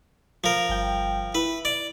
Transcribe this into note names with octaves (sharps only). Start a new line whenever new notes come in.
F3 A#4
G1 G5
E4 B4
D5 D7